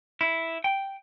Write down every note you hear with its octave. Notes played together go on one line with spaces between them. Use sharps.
E4
G5